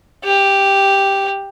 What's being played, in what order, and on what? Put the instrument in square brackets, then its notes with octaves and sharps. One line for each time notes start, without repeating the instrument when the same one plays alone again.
[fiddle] G4